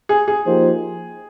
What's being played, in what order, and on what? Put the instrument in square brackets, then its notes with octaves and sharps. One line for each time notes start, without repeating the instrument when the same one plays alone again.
[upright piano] G#4
G#4
[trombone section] F3 A#3 D#4 G4 C5